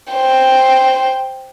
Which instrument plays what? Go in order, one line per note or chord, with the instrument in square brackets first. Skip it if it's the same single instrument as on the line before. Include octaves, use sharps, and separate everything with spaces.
[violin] C5 G5